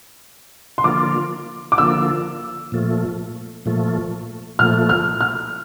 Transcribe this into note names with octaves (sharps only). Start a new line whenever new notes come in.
C6
D3 F3 A#3 F4 D6
D6
D3 F3 A#3 F4 E6
A#2 F3 A3
A#2 F3 A3
A#2 F3 A3 F6
F6
F6